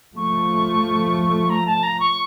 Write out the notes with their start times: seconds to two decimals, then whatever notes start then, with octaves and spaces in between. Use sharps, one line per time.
0.16 F3 A3 C#6
1.49 A#5
1.66 A5
1.83 A#5
2.00 C#6